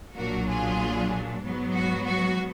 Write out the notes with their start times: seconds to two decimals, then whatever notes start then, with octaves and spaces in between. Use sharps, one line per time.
0.16 B1 A#2 F#3 D4 F#4 A#4
0.48 F4 G#4
1.43 G#2 F#3 B3
1.75 F#4
2.06 F#4